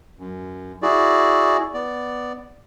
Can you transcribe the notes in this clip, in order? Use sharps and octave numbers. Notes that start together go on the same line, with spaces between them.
F#2
E4 F#4 G#4 D5
B3 D5